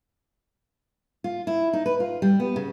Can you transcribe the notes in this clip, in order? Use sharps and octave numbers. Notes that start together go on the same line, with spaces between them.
F4
E4
D#4
B4
F4
G3
B3
C#3